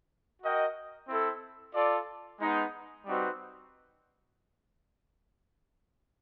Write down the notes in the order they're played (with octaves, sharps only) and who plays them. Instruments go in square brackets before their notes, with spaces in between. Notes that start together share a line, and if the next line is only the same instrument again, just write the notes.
[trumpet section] F#4 A#4 D#5 G5
C4 E4 A4
F4 A4 D5
G#3 B3 D#4
G3 C4 D#4 F#4 B4